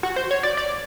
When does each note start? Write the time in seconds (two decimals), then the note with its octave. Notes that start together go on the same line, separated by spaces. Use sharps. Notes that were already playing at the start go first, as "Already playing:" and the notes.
0.03 F#4
0.16 C5
0.31 C#5
0.43 D5
0.57 D5